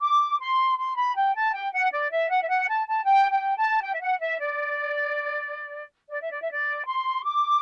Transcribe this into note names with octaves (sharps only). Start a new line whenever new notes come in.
D6
C6
C6
B5
G5
A5
G5
F#5
D5
E5
F#5
E5
F#5
A5
A5
G5
G5
A5
G5
E5
F#5
E5
D5
D5
E5
D5
E5
D5
C6
D6